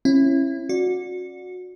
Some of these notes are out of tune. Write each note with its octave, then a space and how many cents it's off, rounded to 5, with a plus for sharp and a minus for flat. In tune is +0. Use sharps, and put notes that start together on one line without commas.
C#4 -30 E4 +15
F#4 -25 D5 +0